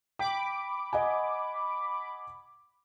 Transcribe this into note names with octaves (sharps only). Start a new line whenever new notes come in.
G5 B5 D6
D#5 F#5 G#5